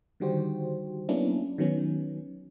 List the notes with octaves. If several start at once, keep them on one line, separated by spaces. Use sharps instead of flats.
D3 D#3 G3 F#4 G4 C5
F#3 A#3 B3 C#4 D4 E4
D#3 F#3 B3 C#4